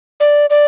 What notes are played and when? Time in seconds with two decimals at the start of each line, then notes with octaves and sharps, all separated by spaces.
0.20 D5
0.50 D5